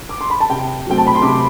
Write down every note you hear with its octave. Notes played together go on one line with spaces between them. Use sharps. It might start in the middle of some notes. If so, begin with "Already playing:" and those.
D6
C6
B5
A5
C3 G5
F#3 A3 C4 G5
A5
B5
C6
C3 D6